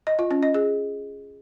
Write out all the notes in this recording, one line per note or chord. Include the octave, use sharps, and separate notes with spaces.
D#5
F4
C#4
D#5
G#4